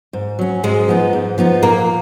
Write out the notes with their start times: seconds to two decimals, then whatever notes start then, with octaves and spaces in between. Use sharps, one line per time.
0.13 G#2
0.39 F#3 C#4
0.63 G#2 G#3
0.88 F3 B3 D#4
1.13 G#2
1.38 F3 B3 D#4
1.62 A#2 A#3